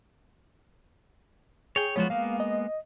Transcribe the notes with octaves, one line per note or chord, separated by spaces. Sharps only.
G#4 C#5 G5
F3 G#3 B3 F4 F#4 C#5
G#3 A#3 B3 F5
D#5